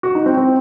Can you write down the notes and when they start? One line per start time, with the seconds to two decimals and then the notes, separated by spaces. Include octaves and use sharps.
0.03 F#4
0.15 D#4
0.26 C4
0.37 C4